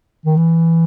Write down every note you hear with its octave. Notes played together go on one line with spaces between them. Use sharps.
D#3
E3